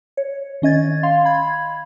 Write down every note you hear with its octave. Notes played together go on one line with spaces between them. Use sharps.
C#5
D#3 C#4 D#5 G#6 A6
F5 C6
B5 G#6